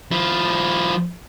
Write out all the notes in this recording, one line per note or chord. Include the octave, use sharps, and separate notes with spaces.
F3 E4